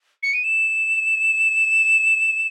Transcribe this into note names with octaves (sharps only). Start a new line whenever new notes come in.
C#7
D#7
E7